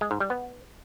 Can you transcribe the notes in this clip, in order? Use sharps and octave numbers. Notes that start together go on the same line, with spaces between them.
G#3
G#2
G3
B3